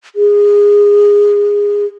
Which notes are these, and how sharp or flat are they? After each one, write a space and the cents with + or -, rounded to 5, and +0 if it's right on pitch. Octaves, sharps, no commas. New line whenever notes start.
G#4 -20